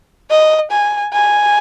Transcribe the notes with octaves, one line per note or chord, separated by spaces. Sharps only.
D#5
G#5
G#5